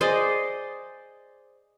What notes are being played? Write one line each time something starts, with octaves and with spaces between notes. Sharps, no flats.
G#4 C5 D5 D#5